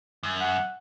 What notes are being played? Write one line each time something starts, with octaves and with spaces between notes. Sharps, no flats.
F#2
F#5